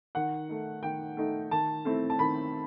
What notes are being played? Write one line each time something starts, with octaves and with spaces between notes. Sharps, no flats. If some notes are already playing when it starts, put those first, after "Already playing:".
D#3 F#5
A3 D#4
D#3 G5
A3 D#4
D#3 A5
A3 C4 E4
A5
D#3 B5